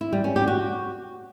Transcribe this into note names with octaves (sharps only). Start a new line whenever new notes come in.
E4
G3
C#4
G4
F#4